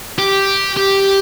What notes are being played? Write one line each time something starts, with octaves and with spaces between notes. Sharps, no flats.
G4
G4